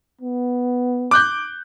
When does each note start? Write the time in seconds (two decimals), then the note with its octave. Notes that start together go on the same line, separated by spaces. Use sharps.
0.21 B3
1.11 D6 F#6 G6